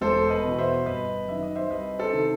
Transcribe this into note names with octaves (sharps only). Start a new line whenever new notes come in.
E1 A4 C5
B4 D#5
E2 B2
C5 E5
G1 B4 D#5
F#2 D#3 E5
D#5
C5 E5
C2 B4 D#5
A4 C5
C3 D#3